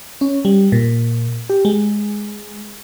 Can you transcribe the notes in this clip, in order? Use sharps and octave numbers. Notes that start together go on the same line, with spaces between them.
C#4
G3
A#2
G4
G#3